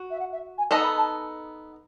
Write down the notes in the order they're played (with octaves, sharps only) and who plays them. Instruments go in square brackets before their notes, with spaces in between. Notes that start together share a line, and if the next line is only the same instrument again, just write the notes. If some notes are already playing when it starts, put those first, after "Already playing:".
Already playing: [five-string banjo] F#4
[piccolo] E5
F#5
E5
G#5
[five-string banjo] B3 D#4 A4 D#5 [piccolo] A5
[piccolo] B5
A5